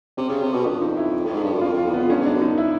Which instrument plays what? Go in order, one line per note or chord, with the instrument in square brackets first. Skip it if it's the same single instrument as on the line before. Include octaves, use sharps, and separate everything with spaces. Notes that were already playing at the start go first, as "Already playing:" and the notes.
[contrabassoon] C3 [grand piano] C#4
[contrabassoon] C#3
C3
B2
[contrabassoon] F2 [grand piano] D4
[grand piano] D#4
E4
[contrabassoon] A2
G#2
G2
F#2
[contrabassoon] F2 [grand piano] F4
[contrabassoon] F2 [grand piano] F4
[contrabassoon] E2
[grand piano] B3
[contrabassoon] F2
[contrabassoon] G2 [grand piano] C#4
[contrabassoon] G#2 [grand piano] D4
[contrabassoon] F#2
[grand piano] D#4
E4